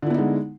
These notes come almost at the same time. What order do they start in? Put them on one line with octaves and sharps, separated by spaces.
D3 E4 B3 D#4 G#3